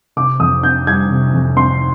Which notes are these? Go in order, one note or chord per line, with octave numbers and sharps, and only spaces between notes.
C3 D6
F2 D#6
C4 G6
G3 G#6
C3
F2
C4 C6